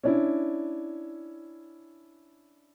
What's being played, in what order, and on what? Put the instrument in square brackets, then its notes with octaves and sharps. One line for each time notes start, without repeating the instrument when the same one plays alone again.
[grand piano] C#4 D4 E4